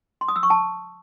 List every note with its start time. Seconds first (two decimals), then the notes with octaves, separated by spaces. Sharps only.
0.21 C6
0.28 D#6
0.36 E6
0.43 C#6
0.50 A5